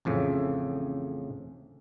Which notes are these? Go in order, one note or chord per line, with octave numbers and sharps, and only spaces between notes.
A1 F2 A2 C#3